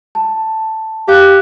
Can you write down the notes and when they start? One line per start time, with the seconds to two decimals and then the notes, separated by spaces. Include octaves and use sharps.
0.15 A5
1.08 G4 F5 F#6